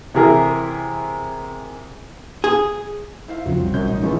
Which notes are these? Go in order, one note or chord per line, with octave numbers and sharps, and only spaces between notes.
C3 E3 E4 G#4 A#4
G#4
E4 C5 F5
F2 C#3 F3 F#3 C4 F4
B1 G3
B1 F#2 G6
A1 D#4
C#2 D#3 F3 E4